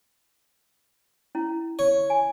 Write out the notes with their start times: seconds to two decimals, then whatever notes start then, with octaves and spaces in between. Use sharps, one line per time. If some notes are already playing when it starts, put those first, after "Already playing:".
1.35 C#4 E4
1.79 C#5
2.10 G#5